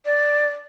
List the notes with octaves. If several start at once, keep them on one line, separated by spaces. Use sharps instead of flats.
D5